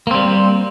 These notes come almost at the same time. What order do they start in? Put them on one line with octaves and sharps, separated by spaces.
A#3 C4 G3